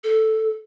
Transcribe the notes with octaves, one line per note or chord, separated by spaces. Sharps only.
A4